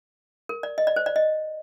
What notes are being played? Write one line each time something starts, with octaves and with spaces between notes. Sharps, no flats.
A#4
D5
D#5
D5
C5
D5
D#5